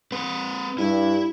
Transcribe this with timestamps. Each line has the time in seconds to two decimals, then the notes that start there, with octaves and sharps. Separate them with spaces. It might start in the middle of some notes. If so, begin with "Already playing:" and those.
0.12 C4 B4
0.78 G2 E4